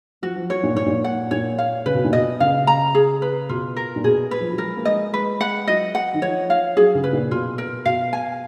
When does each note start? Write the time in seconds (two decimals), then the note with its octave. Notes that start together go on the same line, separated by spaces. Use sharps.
0.22 F3 F#4
0.36 F3
0.50 F#3 C#5
0.63 A#2
0.75 G#2 C#5
0.86 A#2
1.04 F#5
1.31 A#2 C#5
1.58 F5
1.86 C#3 B4
1.95 B2
2.05 A#2
2.13 B2 D#5
2.40 C#3 F5
2.67 A#5
2.95 G#4
3.22 B4
3.49 B2 F4
3.77 A#4
3.96 A#2
4.04 B2 G#4
4.31 B4
4.41 F3
4.52 F#3
4.58 G#3 A#4
4.77 A#3
4.85 G#3 D#5
5.12 G#3 B4
5.41 F#5
5.67 F#3 D#5
5.95 F#5
6.14 D#3
6.22 F3 C#5
6.50 F5
6.77 F#3 G#4
6.95 C#3
7.04 B4
7.13 A#2
7.31 B2 F4
7.58 A#4
7.85 B2 F5
8.13 G#5